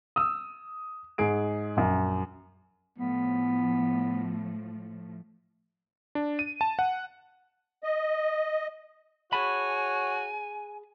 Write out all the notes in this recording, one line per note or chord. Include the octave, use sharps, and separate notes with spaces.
D#6 E6
G#2 G#4 D7
A#1 F#2
A2 F3 A3 B3
D4
D#7
A5
F#5
D#5
F#4 G#4 C#5 G#5 A5 B5